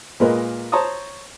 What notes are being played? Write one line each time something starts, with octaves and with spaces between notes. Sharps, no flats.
A#2 G#3 A#3 A#4 B4 D#5
C5 C#5 A5 A#5 C#6 D#6